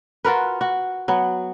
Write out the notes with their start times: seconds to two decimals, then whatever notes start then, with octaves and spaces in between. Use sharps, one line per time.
0.25 F4 F#4 A#4 B4
0.61 F#4
1.08 F#3 B3